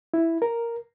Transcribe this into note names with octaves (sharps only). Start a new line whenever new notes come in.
E4
A#4